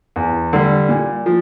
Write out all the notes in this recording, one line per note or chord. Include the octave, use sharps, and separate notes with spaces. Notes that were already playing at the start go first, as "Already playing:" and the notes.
E2
D3 G3
A#2
F3